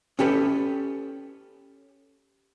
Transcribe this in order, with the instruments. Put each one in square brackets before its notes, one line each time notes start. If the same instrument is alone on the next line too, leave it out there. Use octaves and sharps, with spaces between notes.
[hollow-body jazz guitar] C#4 G4 A4 B4